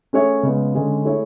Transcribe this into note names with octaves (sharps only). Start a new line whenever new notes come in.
A3 C#4 G#4 C#5 E5
C#3 G#3 B3
D3 G#3 C#4 G#4
A3 E4 G#4 C#5 E5